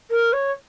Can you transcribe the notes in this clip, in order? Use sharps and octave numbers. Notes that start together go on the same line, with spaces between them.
A#4
C#5